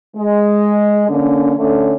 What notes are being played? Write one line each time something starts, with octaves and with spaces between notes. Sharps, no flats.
G#3
D3 A#3 C#4
D3 A3 C#4